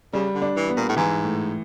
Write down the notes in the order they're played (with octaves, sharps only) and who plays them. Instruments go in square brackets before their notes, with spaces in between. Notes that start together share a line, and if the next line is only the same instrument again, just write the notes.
[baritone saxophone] C#3 [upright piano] G3
[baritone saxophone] D3
[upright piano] D4
[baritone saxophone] E3
[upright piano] B3
[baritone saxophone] A#2
A2
[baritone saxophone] G#2 [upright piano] E3
[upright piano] A2